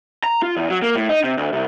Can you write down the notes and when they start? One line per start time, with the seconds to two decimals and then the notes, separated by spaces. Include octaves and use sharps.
0.24 A#5
0.42 F4
0.57 E2
0.70 F#3
0.82 A#3
0.96 A2
1.09 D#4
1.24 C3
1.37 D2
1.53 C2